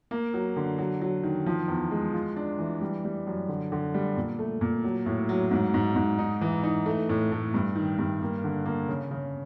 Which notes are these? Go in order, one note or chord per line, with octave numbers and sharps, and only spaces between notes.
A#3
F#3
D3
F#3
F#3
D#3
F3
E2
G#3
F4
D4
E3
G3
G3
F#2
D3
D3
G3
A#2
A3
A#2
F#3
A2
F#3
G#2
G#2
G#2
D#4
E3
D#4
A3
A2
A2
G2
D#3
G2
A#3
D3
A#3
C#3
C#3